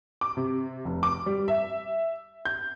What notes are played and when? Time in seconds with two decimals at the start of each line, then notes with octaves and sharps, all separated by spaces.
0.21 D6
0.37 C3
0.85 F1
1.03 D6
1.26 G3
1.48 E5
2.45 G6